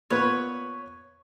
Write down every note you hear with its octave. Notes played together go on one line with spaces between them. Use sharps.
A#2 B3 B4 C#5